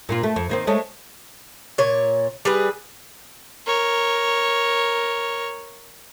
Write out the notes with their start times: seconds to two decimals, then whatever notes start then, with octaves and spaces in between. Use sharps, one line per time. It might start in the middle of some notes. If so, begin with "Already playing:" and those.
0.09 A#2 A#3 F4
0.23 A3
0.36 F2
0.49 D#3 A#3 C4
0.67 G#3 A3 C#4
1.78 A#2 C#5
2.45 G3 G#4 B4
3.67 A#4 C#5